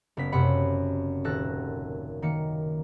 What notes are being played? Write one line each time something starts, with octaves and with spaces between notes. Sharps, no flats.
F#1 B3 B6
F#2 C3 F#5 B5
D#1 A4 F#6 A#6
D#3 A#3 C#7